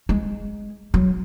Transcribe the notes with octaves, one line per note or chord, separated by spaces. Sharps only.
G#3
F#3